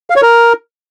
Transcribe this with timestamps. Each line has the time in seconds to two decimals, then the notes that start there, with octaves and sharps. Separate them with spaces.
0.10 F5
0.16 C#5
0.22 A#4